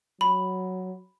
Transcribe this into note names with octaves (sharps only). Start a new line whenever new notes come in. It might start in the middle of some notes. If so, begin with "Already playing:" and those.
F#3 B5